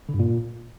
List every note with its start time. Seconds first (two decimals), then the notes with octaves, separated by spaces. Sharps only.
0.09 D3
0.14 G2
0.19 A#2